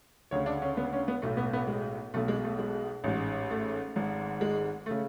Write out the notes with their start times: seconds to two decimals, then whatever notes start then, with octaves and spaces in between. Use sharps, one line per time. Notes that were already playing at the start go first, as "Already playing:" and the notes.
0.31 D2 C#3 C#5
0.46 D4
0.62 C#4
0.77 B3
0.93 C#4
1.08 B3
1.22 B1 A2 A3
1.37 B3
1.53 B3
1.67 G#3
2.14 B1 B2 A3
2.28 G#3
2.44 A3
2.59 G#3
3.04 A1 G#2
3.50 A3
3.96 G#1 G#2
4.41 G#3
4.86 C#3 A3